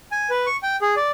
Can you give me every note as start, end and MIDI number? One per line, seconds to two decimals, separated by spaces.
0.12 0.30 80
0.30 0.46 71
0.46 0.57 85
0.63 0.76 79
0.82 0.95 68
0.97 1.11 74